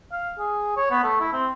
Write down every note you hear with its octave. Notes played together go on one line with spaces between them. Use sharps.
F5
G#4
C#5
B3
A3
E4
C4